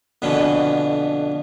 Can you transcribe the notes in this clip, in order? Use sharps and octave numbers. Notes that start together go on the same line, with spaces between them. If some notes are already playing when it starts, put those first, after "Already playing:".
F2 B2 D3 B3 C#4